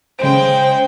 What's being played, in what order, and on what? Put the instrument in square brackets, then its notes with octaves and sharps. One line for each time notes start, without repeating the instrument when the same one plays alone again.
[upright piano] C#3 D7 [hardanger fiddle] G#3 G5 [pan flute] C5